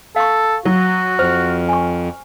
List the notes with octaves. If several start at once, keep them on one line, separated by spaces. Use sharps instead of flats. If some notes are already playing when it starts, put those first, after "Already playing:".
A4 F5 C#6
F#3 F#4
F2 C5 F6
G#5 C#6